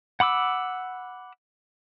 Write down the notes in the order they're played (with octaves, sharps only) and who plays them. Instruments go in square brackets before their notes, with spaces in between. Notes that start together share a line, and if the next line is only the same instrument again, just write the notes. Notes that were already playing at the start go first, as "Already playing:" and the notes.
[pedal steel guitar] F#5 B5 D6 E6